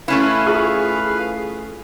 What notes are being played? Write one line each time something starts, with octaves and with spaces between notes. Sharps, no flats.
A3 C#4 E4 B4 F5
F4 G#4 C#6